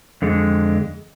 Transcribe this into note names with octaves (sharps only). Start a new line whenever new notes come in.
F2 D3 G#3